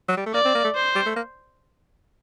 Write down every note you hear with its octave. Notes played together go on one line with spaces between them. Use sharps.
F#3
G3
A3
A#3 D5
C4
A#3
A3
C5
G3
A3
A#3